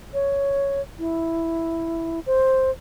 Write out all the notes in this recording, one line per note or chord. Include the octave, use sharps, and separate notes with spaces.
C#5
E4
C5